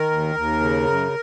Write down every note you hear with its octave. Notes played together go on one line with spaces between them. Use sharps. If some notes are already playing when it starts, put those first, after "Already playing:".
Already playing: D#3 A#4
D#2
D#2
C#3
F#2